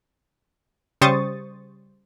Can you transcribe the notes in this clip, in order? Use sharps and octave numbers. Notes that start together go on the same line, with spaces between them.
C#3 G3 C5 C#6 D#6 A6